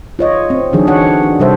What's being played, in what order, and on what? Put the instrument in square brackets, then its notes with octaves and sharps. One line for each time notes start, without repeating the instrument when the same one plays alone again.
[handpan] F4 C#5 D#5
C4
D3 E3 F#3 D4 D#4 G#4
F#4 C#5 F#5
D4
C3 G3 A4 C5 E5